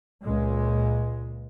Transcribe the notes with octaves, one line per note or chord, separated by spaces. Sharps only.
C#2 A#2 G#3